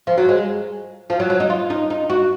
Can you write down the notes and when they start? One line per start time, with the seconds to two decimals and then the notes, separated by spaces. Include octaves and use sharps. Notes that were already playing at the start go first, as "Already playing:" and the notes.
0.07 F3
0.18 F#3
0.29 G#3
1.10 F3
1.20 F#3
1.30 F#3
1.40 D#4
1.50 F4
1.70 D#4
1.90 D#4
2.10 F#4